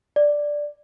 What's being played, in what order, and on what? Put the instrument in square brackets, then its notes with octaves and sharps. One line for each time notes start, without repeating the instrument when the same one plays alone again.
[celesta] D5